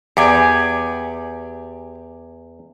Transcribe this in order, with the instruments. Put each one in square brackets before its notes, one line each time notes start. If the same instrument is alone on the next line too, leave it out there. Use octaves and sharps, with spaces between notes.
[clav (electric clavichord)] E2 [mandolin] G4 D5 G#5